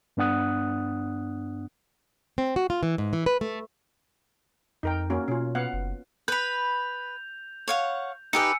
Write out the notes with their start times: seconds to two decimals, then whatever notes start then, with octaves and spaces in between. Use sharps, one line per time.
0.17 G2 B3 D4 F#5 D#6 F#6
2.38 C4
2.56 F#4
2.70 F4
2.83 E3
2.98 G#2
3.13 E3
3.26 B4
3.41 A3
4.83 F2 D#4 A#4 G5
5.10 A#3 C#4 F#4
5.28 B2 C#4 F4
5.55 B3 F5 F#5
5.73 F#1
6.28 B4 B5 G6 F7
7.68 C#5 F5 F#5
8.33 D#4 G4 B4 G#5 E6 C#7